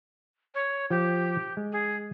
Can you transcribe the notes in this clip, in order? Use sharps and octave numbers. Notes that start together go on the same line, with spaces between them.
C#5
F3 G4
G#3
G#4